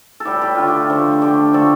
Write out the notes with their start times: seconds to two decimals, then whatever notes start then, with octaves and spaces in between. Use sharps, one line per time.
0.20 A4
0.25 A2 G3 G4
0.42 G4
0.55 D3 A3 F4
0.68 G4
0.90 D3 F3 A3
1.22 D3 A3 G4
1.53 D3 F3 A3 A4